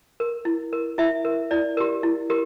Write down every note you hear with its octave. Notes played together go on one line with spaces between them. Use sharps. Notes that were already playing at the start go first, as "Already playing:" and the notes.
A#4
E4
A#4
E4 E5
A#4
E4 D5
G4 A#4
E4
G4 A#4